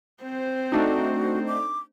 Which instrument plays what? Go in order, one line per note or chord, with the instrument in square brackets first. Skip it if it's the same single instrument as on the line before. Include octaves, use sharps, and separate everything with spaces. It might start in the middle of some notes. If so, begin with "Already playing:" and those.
[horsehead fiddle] C4 C5
[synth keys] A3 D4 D#4 [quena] F#4
[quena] D6